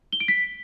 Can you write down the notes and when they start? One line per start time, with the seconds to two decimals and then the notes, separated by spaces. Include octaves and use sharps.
0.12 G7
0.20 D7
0.28 B6